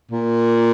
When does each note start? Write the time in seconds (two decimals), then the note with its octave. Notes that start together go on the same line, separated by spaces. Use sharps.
0.11 A#2